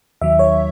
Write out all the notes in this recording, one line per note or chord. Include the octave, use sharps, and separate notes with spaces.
D#2 D#3 F#3 E5
C#5